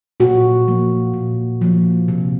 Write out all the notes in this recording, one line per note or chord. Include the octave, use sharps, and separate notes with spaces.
A#2 F#4
F3 A#3
A#2
F3 A#3
C3